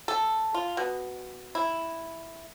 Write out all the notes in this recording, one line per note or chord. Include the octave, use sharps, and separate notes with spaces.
A4
F4
B2
E4